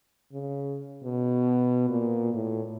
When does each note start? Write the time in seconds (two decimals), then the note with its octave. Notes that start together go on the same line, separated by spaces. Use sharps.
0.33 C#3
1.04 B2
1.89 A#2
2.34 A2